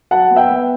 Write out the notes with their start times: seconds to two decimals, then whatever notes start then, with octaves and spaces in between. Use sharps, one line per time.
0.11 F#3 F#5 A5
0.31 B3
0.36 E5 G5
0.49 B3